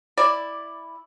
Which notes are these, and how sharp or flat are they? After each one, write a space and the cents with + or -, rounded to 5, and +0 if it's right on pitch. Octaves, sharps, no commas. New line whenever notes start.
E4 +0 D5 +5